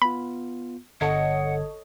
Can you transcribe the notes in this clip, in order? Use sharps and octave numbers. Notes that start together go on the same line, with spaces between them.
B3 F4 B5
G1 D3 A4 C#5 D#5 F#5 G#6